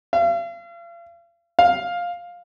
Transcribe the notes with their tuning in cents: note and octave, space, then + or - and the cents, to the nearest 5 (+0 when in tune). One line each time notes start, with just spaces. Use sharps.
F5 -40
F5 +10